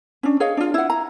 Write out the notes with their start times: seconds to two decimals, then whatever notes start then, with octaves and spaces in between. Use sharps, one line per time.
0.23 C#4 D4
0.40 G#4 C#5 D#5 F5
0.57 D4 F4
0.74 E4 F#5
0.90 A#5